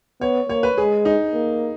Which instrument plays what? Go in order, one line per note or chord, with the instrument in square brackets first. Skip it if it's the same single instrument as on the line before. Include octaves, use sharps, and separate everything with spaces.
[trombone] B3 [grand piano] C#5
[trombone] A#3 [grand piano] C#5
[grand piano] B4
[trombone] G#3 [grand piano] G#4
[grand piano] D#4
[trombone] A#3